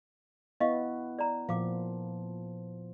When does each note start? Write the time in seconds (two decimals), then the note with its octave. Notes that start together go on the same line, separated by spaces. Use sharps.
0.60 B3 E4 D#5 F5 C#6
1.19 D5 A#5
1.49 A#2 F3 F5 D6